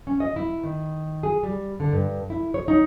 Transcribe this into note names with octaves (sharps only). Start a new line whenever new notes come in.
C#4
D#5
E4
D#3
G#4
G3
D3
G2
E4
C#5
D#4